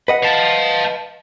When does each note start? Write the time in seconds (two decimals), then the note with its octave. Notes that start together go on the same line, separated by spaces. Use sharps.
0.08 B4 D#5 F#5
0.24 F5 A5